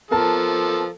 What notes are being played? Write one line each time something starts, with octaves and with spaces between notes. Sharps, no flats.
F3 B3 A4 A#4 A5